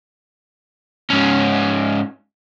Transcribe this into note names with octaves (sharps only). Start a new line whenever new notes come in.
G#2 C#4